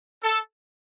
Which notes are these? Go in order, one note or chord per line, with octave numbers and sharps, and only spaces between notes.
A4